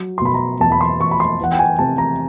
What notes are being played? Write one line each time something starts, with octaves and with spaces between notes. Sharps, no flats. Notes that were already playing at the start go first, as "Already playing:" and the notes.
Already playing: F#3
C6
B2 B5
A#5
E2 A5
B5
C6
E2 C#6
B5
C6
E3 F#5
G5
G#5
C3 A5
A#5